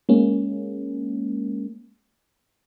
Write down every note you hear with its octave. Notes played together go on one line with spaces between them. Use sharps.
G#3 A#3 C#4